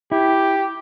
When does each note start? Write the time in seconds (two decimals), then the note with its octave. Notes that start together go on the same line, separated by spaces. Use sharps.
0.12 E4 G4